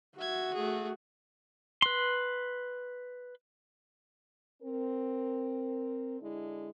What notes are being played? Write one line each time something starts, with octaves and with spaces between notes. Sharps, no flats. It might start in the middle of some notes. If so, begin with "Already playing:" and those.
F#4 E5 G#6
A3 G#4
B4 C6
C4 A#4
D3 G#3 D4 E4